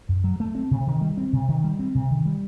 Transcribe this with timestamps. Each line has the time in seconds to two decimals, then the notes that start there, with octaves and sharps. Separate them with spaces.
0.09 F#2
0.24 F#3
0.40 A3
0.55 C4
0.71 C3
0.87 D#3
1.01 G3
1.17 C4
1.33 C3
1.48 D#3
1.64 G3
1.79 C4
1.95 C3
2.10 D#3
2.25 G3